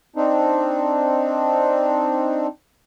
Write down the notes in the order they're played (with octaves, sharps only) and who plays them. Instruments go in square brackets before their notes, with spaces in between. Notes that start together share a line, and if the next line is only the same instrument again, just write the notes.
[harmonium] C4 D4 D#4